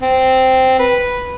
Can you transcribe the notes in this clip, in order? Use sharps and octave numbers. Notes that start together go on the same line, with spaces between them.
C4
B4